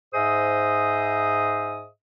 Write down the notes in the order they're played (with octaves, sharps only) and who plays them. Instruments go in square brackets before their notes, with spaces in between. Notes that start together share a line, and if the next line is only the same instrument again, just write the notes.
[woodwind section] G#2 G#4 C5 D#5 E5 D#6